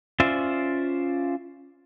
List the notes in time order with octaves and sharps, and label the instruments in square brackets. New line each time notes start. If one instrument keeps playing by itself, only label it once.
[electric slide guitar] C#4 F4 C5 D5 E5